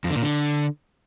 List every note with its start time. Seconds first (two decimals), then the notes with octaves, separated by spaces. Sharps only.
0.04 F2
0.10 D3
0.16 A#2
0.22 D3